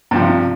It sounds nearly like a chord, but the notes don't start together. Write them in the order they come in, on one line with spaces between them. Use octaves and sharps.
G2 F3 C3